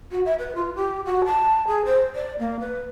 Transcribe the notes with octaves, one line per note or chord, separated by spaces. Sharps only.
F#4
E5
B4
F4
G4
F#4
A5
G#4
C5
D5
A#3
B4